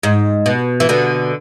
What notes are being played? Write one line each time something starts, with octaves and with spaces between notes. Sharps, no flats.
G#2
B2
E3
B2 D3